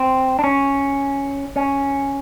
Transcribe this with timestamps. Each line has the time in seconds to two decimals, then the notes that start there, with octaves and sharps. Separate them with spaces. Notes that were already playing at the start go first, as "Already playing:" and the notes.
Already playing: C4
0.39 D4
0.44 C#4
1.56 C#4